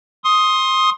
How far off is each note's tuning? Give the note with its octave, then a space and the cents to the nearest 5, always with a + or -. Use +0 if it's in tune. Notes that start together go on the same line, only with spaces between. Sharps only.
C6 +20 D#6 +5